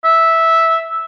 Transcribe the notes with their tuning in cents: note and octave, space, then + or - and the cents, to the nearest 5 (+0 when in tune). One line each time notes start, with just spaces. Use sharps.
E5 -10